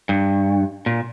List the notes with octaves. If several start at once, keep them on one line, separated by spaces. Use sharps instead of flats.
G2
A#2